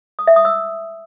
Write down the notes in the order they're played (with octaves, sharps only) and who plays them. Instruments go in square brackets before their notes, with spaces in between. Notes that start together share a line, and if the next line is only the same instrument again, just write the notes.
[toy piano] D#6
E5
D#6
E6